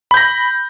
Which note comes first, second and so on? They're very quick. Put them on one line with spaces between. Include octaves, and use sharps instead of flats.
B5 G6 A#6